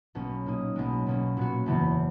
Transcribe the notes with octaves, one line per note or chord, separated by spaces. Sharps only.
B1 B2 A#3 C#4
A#2 A#3 D#4
B1 B2 G#3
B1 B2 A#3 C#4
A#2 F#3 B3 F#4
F#1 E2 C#3 E3 B3